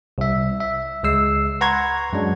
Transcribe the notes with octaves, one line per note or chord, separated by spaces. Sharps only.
C2 E5
E5
C#2 G#3 E6 C7
B4 F#5 A#5 C6 C#6 G#6
F#2 F#3 G#3 D4